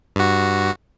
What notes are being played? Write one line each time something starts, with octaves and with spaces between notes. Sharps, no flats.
G2 F#4